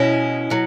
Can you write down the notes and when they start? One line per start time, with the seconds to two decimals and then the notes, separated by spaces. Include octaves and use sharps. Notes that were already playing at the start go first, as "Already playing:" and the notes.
Already playing: B2 G#3 C#4 E4
0.50 B2 F#3